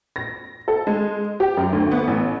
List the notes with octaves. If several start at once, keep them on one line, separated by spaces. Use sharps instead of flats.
A#6
A4
G#3
G4
F#2
D2
B3
A1